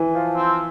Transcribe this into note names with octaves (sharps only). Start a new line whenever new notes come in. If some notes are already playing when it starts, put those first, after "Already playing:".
Already playing: E3
F3
C4